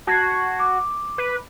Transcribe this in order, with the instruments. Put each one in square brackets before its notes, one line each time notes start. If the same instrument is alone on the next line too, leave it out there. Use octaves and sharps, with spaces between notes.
[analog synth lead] F#4 [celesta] A5 G#6 C7
[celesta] D6
[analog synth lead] B4